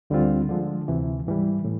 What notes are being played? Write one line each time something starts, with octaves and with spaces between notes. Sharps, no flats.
D2 D3 G3 C4 F4
D3 F3 G#3
D2 C3 E3
G#2 E3 G3
A2